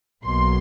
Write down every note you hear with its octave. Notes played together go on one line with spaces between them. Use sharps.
B1 B2 F#3 A#3 C6